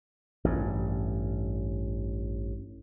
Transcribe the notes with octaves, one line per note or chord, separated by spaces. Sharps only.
A1 G2